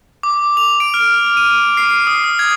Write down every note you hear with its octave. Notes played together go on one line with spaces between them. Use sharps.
D6
F7
D7
F6
D#7
C7
D#6
D#6
G#6